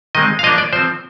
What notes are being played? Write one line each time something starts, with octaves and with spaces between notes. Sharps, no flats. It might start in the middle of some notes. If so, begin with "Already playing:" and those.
D#3 G#3 C4 D#5
F5
F3 A#3 D4 D#5
D5
F3 C4 C5